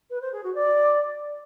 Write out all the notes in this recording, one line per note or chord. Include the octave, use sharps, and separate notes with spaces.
B4
C5
G#4
F#4
D5